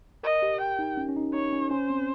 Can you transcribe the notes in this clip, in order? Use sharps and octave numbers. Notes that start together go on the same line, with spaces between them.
A#4 D#5
G4
G5
D#4
C#4
C#4
D#4
D#4 C#5
C#4
C#4 C5
C4